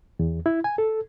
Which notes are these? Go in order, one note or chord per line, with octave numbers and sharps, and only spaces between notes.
E2
E4
G#5
A4